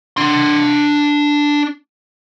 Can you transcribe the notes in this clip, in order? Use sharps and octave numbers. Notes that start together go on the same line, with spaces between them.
D4 C6